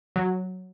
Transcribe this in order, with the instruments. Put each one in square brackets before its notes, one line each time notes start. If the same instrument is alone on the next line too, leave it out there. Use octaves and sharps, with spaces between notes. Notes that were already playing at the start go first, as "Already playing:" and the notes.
[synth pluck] F#3